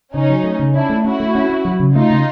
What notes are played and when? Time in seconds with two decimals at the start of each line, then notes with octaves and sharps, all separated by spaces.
0.14 C#3 C#4 D#4
0.29 F#3
0.44 A3
0.59 C#3
0.74 C#4 D4 E4
0.89 A3
1.05 C#4 E4 F#4
1.20 A3
1.35 C#4
1.50 C#4
1.65 F#3
1.80 C#3
1.95 A3 D#4 F4
2.10 C#3